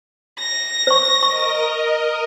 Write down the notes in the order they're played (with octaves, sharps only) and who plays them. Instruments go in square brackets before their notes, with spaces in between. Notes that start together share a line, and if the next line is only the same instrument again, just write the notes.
[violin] A#6
[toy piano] C5 C#6
[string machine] A#4 D#5 [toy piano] C#6